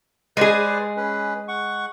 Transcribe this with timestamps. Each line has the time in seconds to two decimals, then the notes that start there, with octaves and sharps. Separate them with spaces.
0.37 G#3 G#4 B4 C5 D5
0.97 C#4 B4
1.48 F#5 C#6